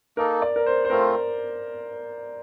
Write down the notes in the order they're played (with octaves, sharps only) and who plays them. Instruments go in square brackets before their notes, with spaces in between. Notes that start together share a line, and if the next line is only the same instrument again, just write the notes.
[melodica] A#3 D#4 A4 [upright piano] A#4
[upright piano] D5
A#4
C5
C5
[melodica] A3 C4 F4 [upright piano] A#4